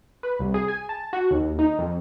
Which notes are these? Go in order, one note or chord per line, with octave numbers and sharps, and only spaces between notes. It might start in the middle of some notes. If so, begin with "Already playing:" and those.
B4
C2
G#4
G#5
A5
F#4
D#2
D#4
F2